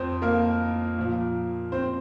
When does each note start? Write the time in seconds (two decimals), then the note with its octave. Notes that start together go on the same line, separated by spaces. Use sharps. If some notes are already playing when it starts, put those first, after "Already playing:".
Already playing: F2 C4 C5
0.22 A#3 A#4
0.98 A#2 F3
1.72 C4 C5